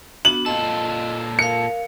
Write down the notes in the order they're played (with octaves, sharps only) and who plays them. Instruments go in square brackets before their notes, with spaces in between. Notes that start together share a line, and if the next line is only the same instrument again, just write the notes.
[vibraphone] B3 D4 F#4 [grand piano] F#7
[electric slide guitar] A#2 F4 A4 [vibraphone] D#5
[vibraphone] A#4 F5 [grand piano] C#7